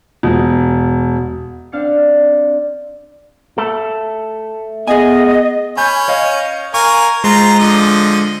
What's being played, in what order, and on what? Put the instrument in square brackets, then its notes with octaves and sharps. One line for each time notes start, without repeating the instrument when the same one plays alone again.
[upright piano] E1
[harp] C4 D4 F5 F6 A6 C#7
[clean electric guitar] A3 A4
[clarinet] B3 [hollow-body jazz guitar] G#4 G#5 [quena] D#5
[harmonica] C#4 [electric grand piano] G#5 B5 G6
[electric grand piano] C#5 D#5 F5
[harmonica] A#4 F5 G#5 [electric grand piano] C#6
[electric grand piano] G#3 [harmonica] F4 C5 A#5
[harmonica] D3 F3 D#5